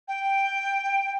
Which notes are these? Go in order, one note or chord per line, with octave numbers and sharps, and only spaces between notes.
G5